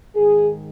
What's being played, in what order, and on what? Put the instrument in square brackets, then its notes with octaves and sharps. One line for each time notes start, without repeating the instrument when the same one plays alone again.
[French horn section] G#2 D#3 G#4